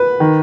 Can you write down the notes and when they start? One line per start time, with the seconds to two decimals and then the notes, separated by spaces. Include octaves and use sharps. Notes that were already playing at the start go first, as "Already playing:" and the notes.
Already playing: B4
0.20 D#3